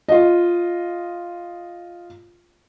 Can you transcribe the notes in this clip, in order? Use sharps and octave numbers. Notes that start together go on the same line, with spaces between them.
F4 D#5